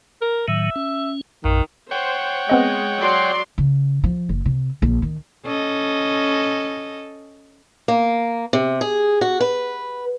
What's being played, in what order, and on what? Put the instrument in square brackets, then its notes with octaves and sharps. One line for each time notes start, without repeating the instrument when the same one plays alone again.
[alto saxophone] A#4
[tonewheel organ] A2 D#3 F#3 [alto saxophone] E5
[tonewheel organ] C#4
[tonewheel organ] A#1 F#2 [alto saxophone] D#3
[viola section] C5 [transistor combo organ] C#5 F#5 G5
[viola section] G#3 [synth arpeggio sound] B3 C4 D#5
[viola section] F#3 D5 C6
[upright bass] C#3
F3
F#1
C3
A#1
D#3
[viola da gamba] C#4 A4 D#5
[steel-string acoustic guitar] A#3
C3
G#4
F#4
B4